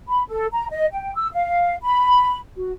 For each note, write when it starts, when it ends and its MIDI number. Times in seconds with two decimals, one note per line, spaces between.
0.08 0.22 83
0.28 0.46 69
0.52 0.67 82
0.70 0.86 75
0.92 1.12 79
1.16 1.28 88
1.33 1.75 77
1.81 2.37 83
2.56 2.71 66